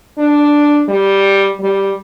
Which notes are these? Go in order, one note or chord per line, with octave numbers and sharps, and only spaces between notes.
D4
G3
G3